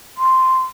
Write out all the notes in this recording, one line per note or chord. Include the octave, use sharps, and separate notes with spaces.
C6